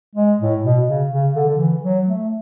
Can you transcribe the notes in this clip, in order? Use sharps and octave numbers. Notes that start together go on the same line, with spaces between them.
G#3
A2
B2
C#3
C#3
D3
D3
E3
F#3
A3